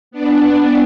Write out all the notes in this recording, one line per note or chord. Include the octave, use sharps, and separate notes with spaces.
B3 D4